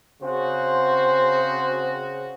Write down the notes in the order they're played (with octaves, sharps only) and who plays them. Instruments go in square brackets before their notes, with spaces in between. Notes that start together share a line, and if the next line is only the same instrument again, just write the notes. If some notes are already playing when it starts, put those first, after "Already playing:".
[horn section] C#3 F#4 [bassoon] C4 [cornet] C5